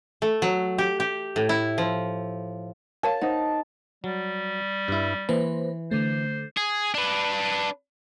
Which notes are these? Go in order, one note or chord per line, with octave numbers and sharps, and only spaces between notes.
A3
F#3
G4
G4
A2
E4
F3
A#4 C#5 F5 A5
D#4 C5 F#5
F#3 G3
G2 E4
E3 A#3 B4 C5
D3 A3 C5
G#4
D4 B4